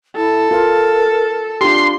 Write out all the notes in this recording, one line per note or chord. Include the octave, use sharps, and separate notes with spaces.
E4 A4
F4 A#4
D4 F4 G4 C6